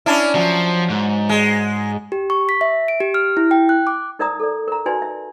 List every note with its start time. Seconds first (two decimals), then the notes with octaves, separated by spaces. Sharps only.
0.06 C#4 D4 E4
0.35 F3 F#3
0.90 G#2
1.29 G#3
2.12 G4
2.30 C#6
2.49 B6
2.61 E5
2.88 D7
3.01 G4
3.14 F6
3.37 E4
3.51 G5
3.69 F#6
3.87 D6
4.19 D#4 A#4 D5 E5 A#5 D#6
4.40 A4 D5
4.68 A#4 A#5
4.86 D#4 F#4 B4 D5 G#5 C6
5.02 E5